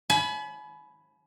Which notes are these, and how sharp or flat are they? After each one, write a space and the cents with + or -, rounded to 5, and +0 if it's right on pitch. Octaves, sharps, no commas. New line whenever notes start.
G#5 +40 B5 +0